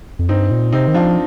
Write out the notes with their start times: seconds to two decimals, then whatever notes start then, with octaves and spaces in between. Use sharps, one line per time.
0.19 F2
0.29 G2 C4 D#4
0.51 A#2
0.72 C3 C4 D#4
0.88 D#3
0.94 F3 D4 F4